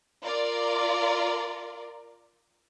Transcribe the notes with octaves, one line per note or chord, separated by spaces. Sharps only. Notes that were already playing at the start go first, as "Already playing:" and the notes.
F4 A#4 D5